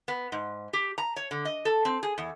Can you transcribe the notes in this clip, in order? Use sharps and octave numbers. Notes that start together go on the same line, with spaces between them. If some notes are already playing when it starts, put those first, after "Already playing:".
B3
G#2
G4
A#5
C#5
D3
D#5
A4
C4
G#4
E2